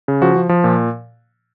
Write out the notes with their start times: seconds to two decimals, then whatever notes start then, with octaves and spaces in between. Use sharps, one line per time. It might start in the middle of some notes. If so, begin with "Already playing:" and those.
0.08 C#3
0.22 F3 F#4
0.36 F3
0.49 F3
0.64 A#2